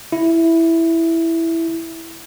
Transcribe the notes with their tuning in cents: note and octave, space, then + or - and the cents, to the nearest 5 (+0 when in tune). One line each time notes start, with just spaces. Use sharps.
E4 +0